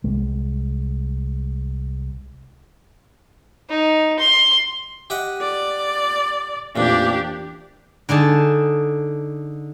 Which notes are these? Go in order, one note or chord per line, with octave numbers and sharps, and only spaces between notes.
C2 G#3
D#4
C6
G4 D#5 F#5
D5
A1 F2 A#2 D4 G4
D3 D#4 G#4 A5